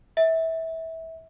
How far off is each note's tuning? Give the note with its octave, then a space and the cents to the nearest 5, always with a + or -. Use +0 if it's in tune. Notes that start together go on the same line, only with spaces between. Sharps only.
E5 -20